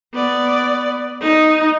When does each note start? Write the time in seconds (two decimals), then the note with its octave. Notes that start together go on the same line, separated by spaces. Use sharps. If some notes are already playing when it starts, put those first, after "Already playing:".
0.14 B3 D5
1.21 D#4